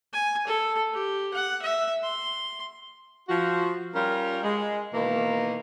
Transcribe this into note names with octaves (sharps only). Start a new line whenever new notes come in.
G#5
A4
G4
F#5
E5
C6
F3 F#4
G3 C#4 F4 A#4
G#3
B2 D#3 E3 A#3